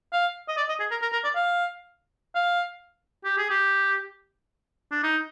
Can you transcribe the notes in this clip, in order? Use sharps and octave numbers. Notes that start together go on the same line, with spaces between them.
F5
D#5
D5
D#5
G#4
A#4
A#4
A#4
D5
F5
F5
G4
G#4
G4
D4
D#4